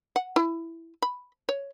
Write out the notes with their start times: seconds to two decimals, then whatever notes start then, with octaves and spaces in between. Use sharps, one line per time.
0.16 F#5
0.36 E4
1.02 B5
1.49 C#5